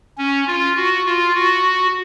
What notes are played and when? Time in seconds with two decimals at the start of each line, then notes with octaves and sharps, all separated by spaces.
0.18 C#4
0.47 F4
0.77 F#4
1.06 F4
1.35 F#4